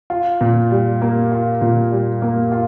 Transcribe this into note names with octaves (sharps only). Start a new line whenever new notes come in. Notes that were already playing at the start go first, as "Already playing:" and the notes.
F4
A#2
G3
A#3
F4
A#2
G3
A#3
F4